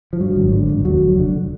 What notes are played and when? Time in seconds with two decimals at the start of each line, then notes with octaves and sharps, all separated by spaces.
0.13 F3
0.20 G2 F#3
0.36 G#1
0.53 D3
0.69 G#1
0.85 D#2 F#3
1.02 F1
1.18 D3